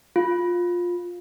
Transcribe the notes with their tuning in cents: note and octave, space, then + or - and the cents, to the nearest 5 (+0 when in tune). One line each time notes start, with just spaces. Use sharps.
F4 +15